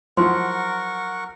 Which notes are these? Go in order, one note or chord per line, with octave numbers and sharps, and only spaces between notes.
F3 F#3 E4 A#4 F#5 C6 C#6